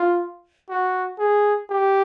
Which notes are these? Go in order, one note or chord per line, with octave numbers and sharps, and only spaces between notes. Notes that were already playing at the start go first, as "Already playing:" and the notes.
Already playing: F4
F#4
G#4
G4